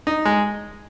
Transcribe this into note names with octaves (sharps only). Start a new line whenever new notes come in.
D#4
G#3